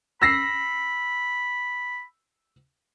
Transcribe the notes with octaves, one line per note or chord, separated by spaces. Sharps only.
B5 E6 A#6 C7